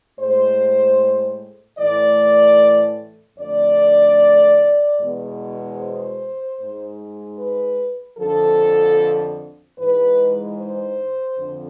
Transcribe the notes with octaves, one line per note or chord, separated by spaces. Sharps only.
A2 G#3 C5
A2 E3 A3 D5
F2 D3 A3 D5
E2 B2 G#3
C5
G#2 G#3
B4
F2 D3 F3 A4
G#2 E3 G#3 B4
C5
F2 D3